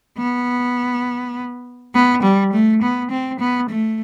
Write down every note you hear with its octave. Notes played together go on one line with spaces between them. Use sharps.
B3
B3
G3
A3
B3
C4
B3
A3